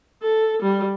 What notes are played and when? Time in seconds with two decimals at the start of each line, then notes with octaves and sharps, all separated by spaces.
0.23 A4
0.63 G3